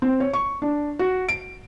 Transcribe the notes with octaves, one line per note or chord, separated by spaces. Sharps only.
C4
C#5
C#6
D4
F#4
D7